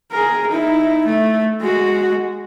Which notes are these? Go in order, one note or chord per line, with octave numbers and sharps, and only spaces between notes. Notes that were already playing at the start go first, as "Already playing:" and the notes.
G#4 A#4
D#4 E4
A3
G#3 F#4